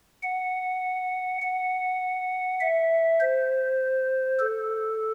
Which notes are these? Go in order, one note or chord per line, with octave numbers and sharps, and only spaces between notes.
F#5
F#5
E5
C5
A4